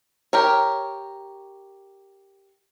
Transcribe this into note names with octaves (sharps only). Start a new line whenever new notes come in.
G4 A#4 C#5